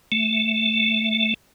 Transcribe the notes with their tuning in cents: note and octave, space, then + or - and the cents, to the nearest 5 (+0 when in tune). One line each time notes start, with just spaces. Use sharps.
A3 +0